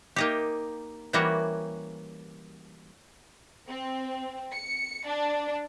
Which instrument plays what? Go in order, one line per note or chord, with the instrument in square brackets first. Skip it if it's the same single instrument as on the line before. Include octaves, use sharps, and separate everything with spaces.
[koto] A#3 D#4 G4
E3 G3 A#3 C#4 F#4
[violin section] C4
C#7
D4